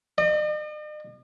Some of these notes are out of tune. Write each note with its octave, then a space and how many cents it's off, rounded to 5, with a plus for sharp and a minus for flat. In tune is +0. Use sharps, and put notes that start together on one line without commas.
D#5 -45